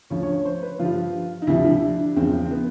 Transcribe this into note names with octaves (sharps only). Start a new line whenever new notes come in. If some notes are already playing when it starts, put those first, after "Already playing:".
D2 C#3 F3 C#5
C#5
C#5
C5
B4
G2 D3 F3 F4
D#4
D2 C3 F3 E4
E4
D4
D4
E2 C#3 F3 C4
C4
B3